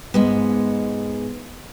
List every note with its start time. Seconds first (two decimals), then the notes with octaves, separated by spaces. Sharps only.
0.14 G#2 G#3 B3